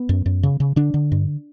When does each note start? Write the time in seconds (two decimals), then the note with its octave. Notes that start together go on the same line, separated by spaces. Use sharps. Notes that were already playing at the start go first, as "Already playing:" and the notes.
Already playing: B3
0.09 F#2
0.26 F#2
0.43 C#3
0.60 C#3
0.76 D3 D4
0.94 D3
1.12 G2